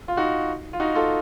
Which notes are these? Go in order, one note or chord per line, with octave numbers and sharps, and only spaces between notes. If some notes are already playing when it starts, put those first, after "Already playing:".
F4
D#4 F#4
F4
D#4 F#4
F4 A4